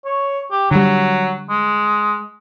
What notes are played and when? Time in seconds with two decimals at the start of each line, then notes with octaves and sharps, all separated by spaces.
0.05 C#5
0.52 G4
0.71 D3 F#3 G3
1.50 G#3